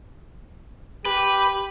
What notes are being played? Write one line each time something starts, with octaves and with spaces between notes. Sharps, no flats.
G4 B4